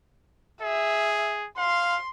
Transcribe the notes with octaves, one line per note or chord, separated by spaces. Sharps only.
G#4 E5
F5 C6